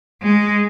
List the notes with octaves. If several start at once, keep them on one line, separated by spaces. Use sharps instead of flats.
G#3